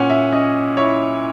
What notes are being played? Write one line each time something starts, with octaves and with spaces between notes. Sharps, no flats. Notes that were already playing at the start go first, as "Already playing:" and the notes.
Already playing: A#2 C#4 F#5 G#5
E5
C#4 D#5
E4 C#5